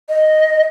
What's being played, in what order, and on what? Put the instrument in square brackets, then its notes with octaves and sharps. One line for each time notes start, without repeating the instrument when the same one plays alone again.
[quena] D#5